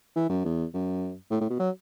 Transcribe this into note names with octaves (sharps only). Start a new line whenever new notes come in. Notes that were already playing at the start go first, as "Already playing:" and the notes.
E3
F#2
E2
F#2
A2
A2
B2
F#3